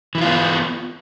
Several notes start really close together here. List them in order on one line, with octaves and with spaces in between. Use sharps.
E3 E4 F4 B3